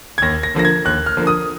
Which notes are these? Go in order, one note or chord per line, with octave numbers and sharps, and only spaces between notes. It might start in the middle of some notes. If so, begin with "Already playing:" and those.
G#6
D#2 A#6
A#6
D3 F3 A#3 A#6
G#6
D#2 F#6
F6
D3 F3 A#3
D#6